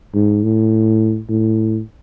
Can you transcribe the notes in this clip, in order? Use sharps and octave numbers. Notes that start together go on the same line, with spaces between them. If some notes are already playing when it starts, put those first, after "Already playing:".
G#2
A2
A2